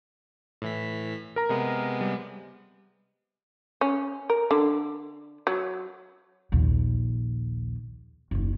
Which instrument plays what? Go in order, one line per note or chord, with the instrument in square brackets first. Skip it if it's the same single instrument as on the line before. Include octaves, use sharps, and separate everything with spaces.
[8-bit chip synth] A2 E3 B6
[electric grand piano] A#4 A#5
[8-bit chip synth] C3 G#3 B3
[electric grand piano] G3
[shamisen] C#4
A#4
D3
F#3
[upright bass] A#1 D#2
F#1 D#2